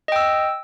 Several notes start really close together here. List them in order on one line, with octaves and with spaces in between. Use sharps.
D#5 G5 E6